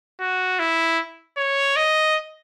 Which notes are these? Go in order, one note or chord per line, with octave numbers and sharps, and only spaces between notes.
F#4
E4
C#5
D#5